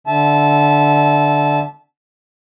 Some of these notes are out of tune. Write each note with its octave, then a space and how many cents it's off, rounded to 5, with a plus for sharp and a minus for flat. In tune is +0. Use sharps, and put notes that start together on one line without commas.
D3 +0 E5 -10 A5 -20